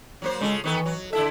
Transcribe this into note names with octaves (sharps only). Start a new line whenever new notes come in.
F#3 A#3 C5
C#3 G#3 F4 A4
D#3 E3 B3 A4
F#3
D3 E4 A4 E5